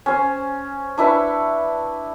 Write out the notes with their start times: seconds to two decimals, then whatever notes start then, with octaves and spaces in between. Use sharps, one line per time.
0.06 C#4 C5
0.98 D4 E4 B4 C#6